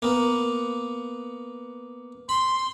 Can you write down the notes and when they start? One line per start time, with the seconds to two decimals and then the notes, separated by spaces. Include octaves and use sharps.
0.02 A#3 B3
2.29 B5 C6